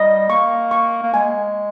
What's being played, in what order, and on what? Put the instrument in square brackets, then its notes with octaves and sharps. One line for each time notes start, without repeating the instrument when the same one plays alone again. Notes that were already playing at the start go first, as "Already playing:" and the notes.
Already playing: [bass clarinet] G3 [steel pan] D#5
[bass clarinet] A#3 [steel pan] C#6
[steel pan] C#6
[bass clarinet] A#3
[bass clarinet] G#3 [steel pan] G#5